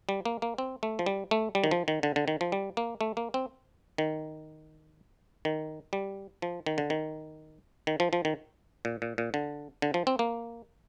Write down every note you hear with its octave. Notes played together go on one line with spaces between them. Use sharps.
G3
A#3
A#3
C4
A3
F3
G3
A3
G3
D#3
F3
D#3
D3
D3
D#3
F3
G3
A#3
A3
A#3
C4
D#3
D#3
G3
F3
D#3
D3
D#3
D#3
F3
F3
D#3
A#2
A#2
A#2
D3
D3
F3
C4
A#3